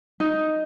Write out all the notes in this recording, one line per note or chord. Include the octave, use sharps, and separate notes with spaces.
D#4